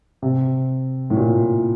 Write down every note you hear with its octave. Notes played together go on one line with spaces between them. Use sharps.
C3
A2
A#2